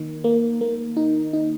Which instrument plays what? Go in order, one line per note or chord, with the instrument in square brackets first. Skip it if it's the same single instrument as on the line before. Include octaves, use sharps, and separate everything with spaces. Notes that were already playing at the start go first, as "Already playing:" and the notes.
Already playing: [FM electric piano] D#3 A#3
A#3
A#3
D#4
D#4